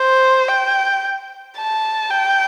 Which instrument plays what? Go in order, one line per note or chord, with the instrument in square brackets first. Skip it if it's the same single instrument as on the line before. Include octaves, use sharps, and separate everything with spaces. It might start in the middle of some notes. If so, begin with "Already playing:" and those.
Already playing: [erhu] C5
G5
A5
G5